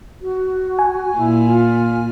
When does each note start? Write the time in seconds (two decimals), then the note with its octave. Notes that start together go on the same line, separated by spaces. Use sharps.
0.22 F#4
0.79 G#5
1.17 A#2 E4
1.47 F4